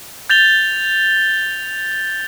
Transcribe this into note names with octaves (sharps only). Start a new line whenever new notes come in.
G6 A6 F7 G7